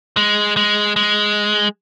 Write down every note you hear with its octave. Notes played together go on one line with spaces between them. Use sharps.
G#3
G#3
G#3